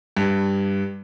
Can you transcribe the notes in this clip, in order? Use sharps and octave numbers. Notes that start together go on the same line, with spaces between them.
G2